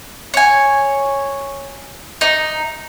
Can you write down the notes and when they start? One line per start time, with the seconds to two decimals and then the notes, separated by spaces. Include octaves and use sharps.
0.34 C#5 G#5
2.21 D#4